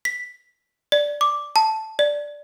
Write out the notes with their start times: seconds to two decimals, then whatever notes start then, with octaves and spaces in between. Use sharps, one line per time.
0.05 B6
0.92 D5
1.21 D6
1.56 A5
1.99 D5